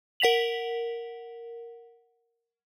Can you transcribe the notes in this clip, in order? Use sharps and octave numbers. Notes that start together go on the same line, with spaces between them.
A#4 F#5 B6 F7 F#7